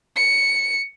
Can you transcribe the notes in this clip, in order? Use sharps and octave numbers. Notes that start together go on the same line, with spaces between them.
C#7